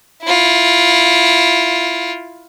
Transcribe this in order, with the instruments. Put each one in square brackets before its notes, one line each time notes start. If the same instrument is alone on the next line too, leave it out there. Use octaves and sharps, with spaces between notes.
[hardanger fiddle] E4 F4